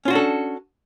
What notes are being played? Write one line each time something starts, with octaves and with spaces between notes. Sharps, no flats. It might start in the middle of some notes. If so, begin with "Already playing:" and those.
C#4 D4 F4 F#4 A4